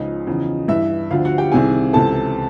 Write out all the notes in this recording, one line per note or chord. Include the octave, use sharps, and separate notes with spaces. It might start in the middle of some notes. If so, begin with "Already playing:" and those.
Already playing: C#2 C#3 F3 D#4 D#5
E2 C#3 F3
G2 E3 E4 E5
D2 D3 F3 F4 F5
F#4 F#5
G4 G5
C2 C3 D#3 G#4 G#5
C#2 C3 E3 A4 A5